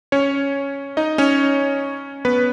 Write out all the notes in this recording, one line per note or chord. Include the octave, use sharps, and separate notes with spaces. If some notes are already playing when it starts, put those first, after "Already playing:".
C#4 C#5
D#4 D#5
C#4 C#5
B3 B4